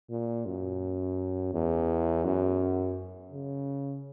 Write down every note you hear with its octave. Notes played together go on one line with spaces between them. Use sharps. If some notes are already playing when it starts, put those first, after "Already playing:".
A#2
F#2
E2
F#2
C#3